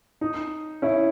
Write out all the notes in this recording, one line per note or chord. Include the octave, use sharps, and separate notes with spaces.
D#4
C#4 E4